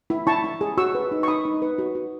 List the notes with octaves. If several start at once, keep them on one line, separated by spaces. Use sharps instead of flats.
E4
E4 A5 C#6
E4
G#4
F#4 C#6 E6
B4
D#4
C#6
D#4 B5 D#6
D#4
B4
F#4
F#4